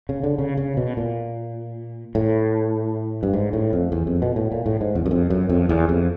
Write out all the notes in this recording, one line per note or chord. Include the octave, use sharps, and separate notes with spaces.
C#3
D3
C#3
C#3
B2
A#2
A2
G2
G#2
A2
F2
E2
F2
B2
A2
A#2
A2
G#2
E2
F#2
F2
F#2
F2
E2
F2